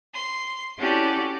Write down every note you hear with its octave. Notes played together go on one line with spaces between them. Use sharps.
C6
C#4 E4 F#4 G4 A4 D5